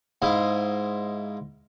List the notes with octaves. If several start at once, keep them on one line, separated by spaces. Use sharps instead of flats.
G#2 E4 D#5 F5